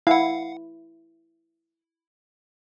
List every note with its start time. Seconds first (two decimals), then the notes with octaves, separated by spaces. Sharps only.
0.07 E4 F5 F#5